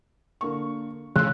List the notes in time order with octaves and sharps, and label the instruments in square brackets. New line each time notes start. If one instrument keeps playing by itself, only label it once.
[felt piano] D3 A#3 C#6
[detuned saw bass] C#3 [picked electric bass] F3 A3 [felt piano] C6 E6 [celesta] F#6